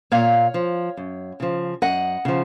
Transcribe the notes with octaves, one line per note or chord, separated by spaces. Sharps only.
A#2 C#5 F5
F3
F#2
C#3 F3
F#2 D#5 F#5
C#3 F3